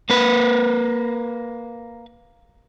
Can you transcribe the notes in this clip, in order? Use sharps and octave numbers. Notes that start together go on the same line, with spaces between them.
A#3 B4